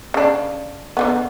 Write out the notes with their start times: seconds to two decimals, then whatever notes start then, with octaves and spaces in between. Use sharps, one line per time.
0.14 C#3 D4
0.97 D3 F3 B3